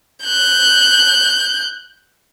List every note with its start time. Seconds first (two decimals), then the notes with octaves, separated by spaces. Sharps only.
0.24 F#6 G6